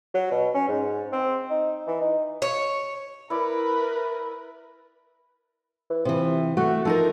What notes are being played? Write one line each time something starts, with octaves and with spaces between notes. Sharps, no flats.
F#3
B2
C#4
G#2
C4
D#4
E3
D#4
C#5
E4 A#4 B4 D5
E3
C3 E3 F3
A3 F#4
F3 D#4 A4 A#4